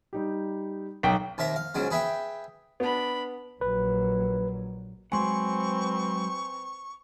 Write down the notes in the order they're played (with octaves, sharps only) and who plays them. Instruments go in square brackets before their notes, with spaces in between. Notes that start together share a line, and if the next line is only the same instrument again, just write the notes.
[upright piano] G3 D#4 G4
[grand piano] B1 G5 [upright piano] B6
[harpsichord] D#2 C3 E5 A#5
F5
C#2 G#2 C#3 F#3 G#3
G#4 B4 E5 G5
[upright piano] B3 [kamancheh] D4 B5
[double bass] A#1 F#3 [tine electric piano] B4
[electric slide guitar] F#3 G#3 F#5 [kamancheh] C4 B4 [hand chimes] G#5 C6 [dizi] C#6